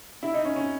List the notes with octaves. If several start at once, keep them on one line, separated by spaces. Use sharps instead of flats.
E4
D#4
C#4
C#4